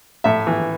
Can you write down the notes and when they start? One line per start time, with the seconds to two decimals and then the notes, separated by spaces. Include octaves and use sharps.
0.24 A2 E5
0.47 E3